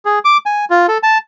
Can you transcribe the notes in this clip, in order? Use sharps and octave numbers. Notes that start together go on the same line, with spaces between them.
G#4
D6
G#5
F4
A4
A5